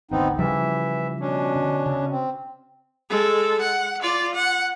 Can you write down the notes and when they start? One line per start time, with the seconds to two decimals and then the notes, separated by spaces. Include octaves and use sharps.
0.11 G#1 D2 D3 B3 C4 D#4
0.39 C#3 E3 F3 G3 E5
1.20 B2 C#4 D4
1.56 D3
1.86 C#3
2.11 C4
3.09 G#3 A4
3.61 F#5
4.02 F4 D5
4.35 F#5